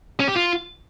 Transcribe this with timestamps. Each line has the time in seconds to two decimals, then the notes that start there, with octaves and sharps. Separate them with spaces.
0.20 C#4
0.28 G4
0.36 F4